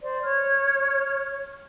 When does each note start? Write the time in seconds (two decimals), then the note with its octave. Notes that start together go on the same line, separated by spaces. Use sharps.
0.01 C5 D5
0.23 C#5 F6